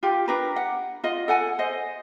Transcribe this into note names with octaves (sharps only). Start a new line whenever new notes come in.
F4 G4
D4 A#4 B4
F#5
F4 D#5
A4 F#5 G#5
C5 D#5